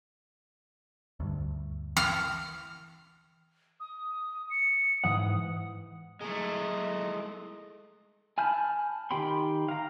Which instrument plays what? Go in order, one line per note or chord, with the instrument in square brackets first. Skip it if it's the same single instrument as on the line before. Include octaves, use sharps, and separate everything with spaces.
[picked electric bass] D2 G2
[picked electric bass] E3 [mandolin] F6
[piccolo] D#6
C#7
[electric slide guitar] G#2 E3 F#5 [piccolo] D#6
[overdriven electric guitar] G#3 A3 [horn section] D#4 E4 D#5
[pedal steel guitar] G#5 A5 B5 F6 G6
D#3 G4 G5 B5 C6
F5 A#5